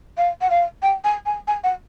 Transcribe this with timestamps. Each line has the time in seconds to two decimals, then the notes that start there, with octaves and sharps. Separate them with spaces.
0.18 F5
0.41 F#5
0.50 F5
0.82 G5
1.04 G#5
1.26 G#5
1.47 G#5
1.64 F#5